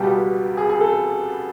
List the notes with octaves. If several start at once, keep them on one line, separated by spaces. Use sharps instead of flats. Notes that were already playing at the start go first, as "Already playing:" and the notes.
Already playing: C#2 B2 G3 B3 G4
G#4
G#4
A4